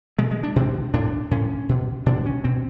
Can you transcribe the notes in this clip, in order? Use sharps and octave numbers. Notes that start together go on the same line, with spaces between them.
B2 G#3
G#3
D4
B2 C4
A2 D4
A2 C#4
B2
B2 D4
C#4
B2 C4